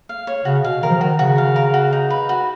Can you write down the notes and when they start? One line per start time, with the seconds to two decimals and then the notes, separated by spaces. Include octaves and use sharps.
0.09 F5
0.27 C#5
0.45 C#3 F#4
0.63 B2 F5
0.83 D#3 A#4
0.90 F3
0.97 D#3 F#4
1.19 C#3 F#4
1.38 F5
1.56 A#4
1.74 F#4
1.93 D#4
2.10 B4
2.29 F#4